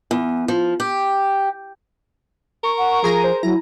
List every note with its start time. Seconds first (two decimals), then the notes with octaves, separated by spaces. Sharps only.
0.11 E2
0.48 F3
0.80 G4
2.64 A#4 C#6
2.78 F#5
3.04 F3 G#4 A#5 D#7
3.24 C5
3.43 F#3 E4 A#5